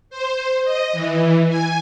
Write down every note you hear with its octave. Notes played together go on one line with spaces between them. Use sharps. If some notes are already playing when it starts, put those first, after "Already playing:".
C5
D#5
E3
G#5